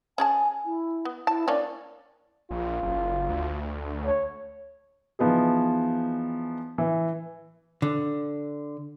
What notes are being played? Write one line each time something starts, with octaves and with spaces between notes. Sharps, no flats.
C#4 G#4 G#5 A5
E4
B3
E4 A5
A#3 C#4 D4 D5
A#1 F4
F#1
D2
C#5
E3 F3 B3 D#4 G#4
E3
D3